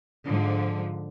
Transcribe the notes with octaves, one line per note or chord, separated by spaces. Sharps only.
G#2 D3 F3